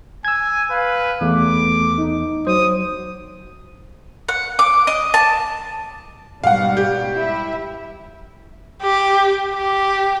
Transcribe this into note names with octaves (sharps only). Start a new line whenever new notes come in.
G#5 E6 G#6
B4 F5
E2 A3 D6
D#4
F#3 C5 D#6
F#5
D6
D#5
A5
G#2 B2 G3 F5 F#5
G4
E4 E5
G4
G4